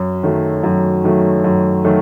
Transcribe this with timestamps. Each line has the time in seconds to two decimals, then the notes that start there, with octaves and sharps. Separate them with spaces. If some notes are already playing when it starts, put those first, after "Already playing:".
Already playing: F#2
0.23 D#3 F#3 A3
0.64 F#2
1.04 D#3 F#3 A3
1.44 F#2
1.84 D#3 F#3 A3